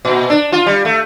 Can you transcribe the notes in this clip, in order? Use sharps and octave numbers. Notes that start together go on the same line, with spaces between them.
A#2
D4
F4
G3
A3